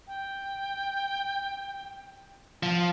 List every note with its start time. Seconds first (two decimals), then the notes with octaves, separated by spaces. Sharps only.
0.07 G5
2.63 F3